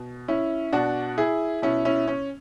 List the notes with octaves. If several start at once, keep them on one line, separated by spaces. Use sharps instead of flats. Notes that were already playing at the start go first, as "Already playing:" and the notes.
Already playing: B2
C#4 E4
B2 D4 F#4
E4 G#4
B2 C#4 E4
C#4 E4
C#4